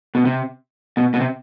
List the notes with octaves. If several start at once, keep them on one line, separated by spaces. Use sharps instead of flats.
B2
C3
B2
B2
C3